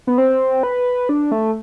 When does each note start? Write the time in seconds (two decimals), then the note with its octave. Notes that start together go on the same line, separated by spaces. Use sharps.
0.07 B3
0.18 C4
0.63 B4
1.09 D4
1.32 A3